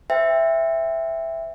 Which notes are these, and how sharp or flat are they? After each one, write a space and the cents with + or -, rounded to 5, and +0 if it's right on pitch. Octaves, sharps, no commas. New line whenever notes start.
C5 -25 E5 +0 G5 +25